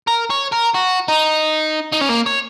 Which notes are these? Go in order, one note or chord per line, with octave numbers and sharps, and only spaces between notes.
A#4
C#5
A#4
F#4
D#4
D#4
C#4
A#3
C#5